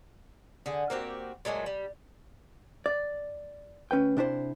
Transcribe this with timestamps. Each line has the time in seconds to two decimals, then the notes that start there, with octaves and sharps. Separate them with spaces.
0.66 D3 G#4
0.90 A#3 C4 F#4 G4
1.45 A#2 F#3 G#3 A3
1.66 G3
2.86 D5
3.91 D2 C#4 B4 G5
4.17 C3 D4 E4 C5